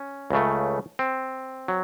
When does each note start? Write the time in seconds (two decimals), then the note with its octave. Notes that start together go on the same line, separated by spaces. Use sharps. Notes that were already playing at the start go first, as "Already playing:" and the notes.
Already playing: C#4
0.30 C#2 C#3 A3
0.99 C4
1.68 F#3